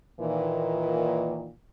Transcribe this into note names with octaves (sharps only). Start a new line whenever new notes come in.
A#2 D#3 E3